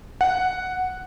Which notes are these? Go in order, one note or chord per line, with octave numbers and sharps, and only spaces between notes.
F#5